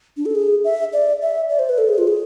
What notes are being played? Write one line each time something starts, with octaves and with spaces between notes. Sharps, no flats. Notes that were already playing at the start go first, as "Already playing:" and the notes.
D4
A4
G#4
E5
D5
E5
D5
C5
B4
A4
G#4
F4
G#4